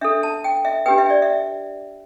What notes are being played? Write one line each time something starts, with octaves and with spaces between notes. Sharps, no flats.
D4 A4 E5
A5
G5
E5
D4 G4 B4 G5
E5
D5
E5